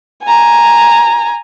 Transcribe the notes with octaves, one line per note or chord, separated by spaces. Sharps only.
G#5 A#5